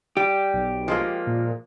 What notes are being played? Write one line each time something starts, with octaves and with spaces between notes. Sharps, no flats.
G3 G4
B1
F3 G#3 A#3
A#2